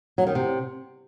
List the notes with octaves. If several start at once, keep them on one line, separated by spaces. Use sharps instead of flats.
F#3
D#3
C3